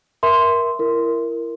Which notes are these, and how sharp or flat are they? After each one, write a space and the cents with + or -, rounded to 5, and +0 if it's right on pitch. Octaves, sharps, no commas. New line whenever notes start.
A#4 +20 E5 +0 C6 -5
E4 +30 A#4 -5